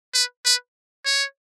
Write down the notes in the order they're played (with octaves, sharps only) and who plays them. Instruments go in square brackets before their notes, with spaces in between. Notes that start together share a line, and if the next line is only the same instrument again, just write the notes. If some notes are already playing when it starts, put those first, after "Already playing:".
[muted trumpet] B4
B4
C#5